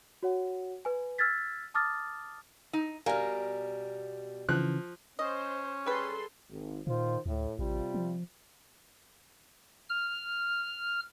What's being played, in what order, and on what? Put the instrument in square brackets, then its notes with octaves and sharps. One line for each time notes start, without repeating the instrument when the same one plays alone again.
[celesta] F#4 C#5 F#5
B4 G#5
E6 F6 G#6 A6 B6
A5 D6 D#6 F6 A6
[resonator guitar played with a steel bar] D#4
[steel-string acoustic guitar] B2 G3 [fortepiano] A#4 G#5 [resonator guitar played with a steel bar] F5
[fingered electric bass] C#3 E3 [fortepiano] F3 F#6
[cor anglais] C#4 [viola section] C5 [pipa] D#5
[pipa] G3 B4 [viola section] G#4 A4 C6
[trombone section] G#1
[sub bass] A#2 [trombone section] D#3 F4 C5
[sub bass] D2 [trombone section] A2
[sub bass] A1 [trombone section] C3 G3 F4
[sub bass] F3
[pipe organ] F6